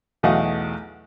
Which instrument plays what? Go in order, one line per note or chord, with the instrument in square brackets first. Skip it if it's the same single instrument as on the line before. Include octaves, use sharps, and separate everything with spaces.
[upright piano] B1 E2 A3 D#5 F5 F#5